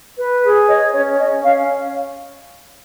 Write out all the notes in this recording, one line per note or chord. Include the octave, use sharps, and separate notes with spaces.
B4
G#4
C#5 D#5
C#4 C#5
C#4 D#5
C#4 F5